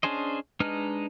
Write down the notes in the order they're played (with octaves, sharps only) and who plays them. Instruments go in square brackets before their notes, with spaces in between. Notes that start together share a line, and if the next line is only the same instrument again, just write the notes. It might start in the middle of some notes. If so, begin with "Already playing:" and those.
[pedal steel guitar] C#4 D4 G#4 C5 D#5
G#3 D4 D#4 B4 F6